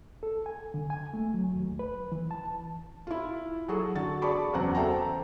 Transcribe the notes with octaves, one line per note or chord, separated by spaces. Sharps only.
A4
G#5
D3
G#5
A3
F#3
D#2
B4
E3
A5
E4 F4
F#3 F#4 G#4 A4
D3 F#4 A6
G#4 D5 A5 B5 C#6 D6
E2 C#3 F#3 C4 F#5 A#5
A4 C5 E5 G5 A5 A#5